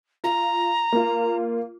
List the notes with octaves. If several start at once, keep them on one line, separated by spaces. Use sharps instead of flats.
F4 A#5
A#3 F4